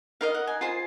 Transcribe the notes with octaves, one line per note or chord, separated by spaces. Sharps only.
D#4 A#4 D#5 F5
F#5
G#5
F4 G#4 C5 C6